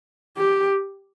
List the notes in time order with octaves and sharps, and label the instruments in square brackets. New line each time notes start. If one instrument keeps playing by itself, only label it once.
[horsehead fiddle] G4